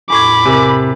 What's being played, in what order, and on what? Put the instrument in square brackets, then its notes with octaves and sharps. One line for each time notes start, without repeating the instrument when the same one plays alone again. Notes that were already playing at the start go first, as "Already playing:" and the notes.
[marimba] E2 A2 G#6 [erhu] B5 [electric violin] D6
[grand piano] C3 [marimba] A#4 G#5